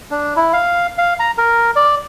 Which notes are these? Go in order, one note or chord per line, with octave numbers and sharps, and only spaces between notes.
D4
E4
F5
F5
A#5
A#4
D5